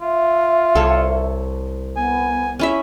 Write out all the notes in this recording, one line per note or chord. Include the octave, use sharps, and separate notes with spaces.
F4 E5
C2 A4 C#5
B3 G#5
C#4 E4 E5